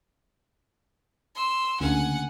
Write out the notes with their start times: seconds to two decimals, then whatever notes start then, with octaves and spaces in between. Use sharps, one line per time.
1.35 C6 E6
1.81 D2 C#3 A#3 F#5 G#5